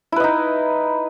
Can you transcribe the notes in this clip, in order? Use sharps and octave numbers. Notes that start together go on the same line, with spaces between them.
D#4 E4 B4 D#5